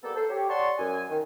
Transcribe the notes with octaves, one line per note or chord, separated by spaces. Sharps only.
G3 A#3 B3 G4 A4
A4 C5
G4 C#5
C#5 D5 F#5 A5 C6 C#6
F#2 G#5
D#3